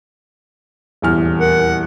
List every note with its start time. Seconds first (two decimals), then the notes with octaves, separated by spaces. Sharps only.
1.02 D#1 E2 F6
1.40 A#4 F#5